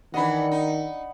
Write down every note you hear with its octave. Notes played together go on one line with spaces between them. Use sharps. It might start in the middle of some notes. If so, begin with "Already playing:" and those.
D#3 E3 D4 D#5 F#5 B5
D#4